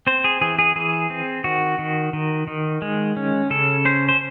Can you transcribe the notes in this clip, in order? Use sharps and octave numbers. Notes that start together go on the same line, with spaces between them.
C4 C5
G#4
E3 G#4
G#4
E3 G#4
C4
D#3 F#4
D#3
D#3
D#3
G#3
C#4
C#3 A4
C#4 C5
C5